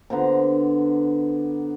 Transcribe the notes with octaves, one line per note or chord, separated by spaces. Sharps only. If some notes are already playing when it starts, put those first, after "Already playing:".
D3 B3 C5 A#5